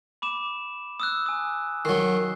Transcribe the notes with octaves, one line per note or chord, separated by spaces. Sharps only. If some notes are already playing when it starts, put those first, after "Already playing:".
B5 D6 E7
D#6 E6 F#6
G#5 D#6
D#3 F#3 C7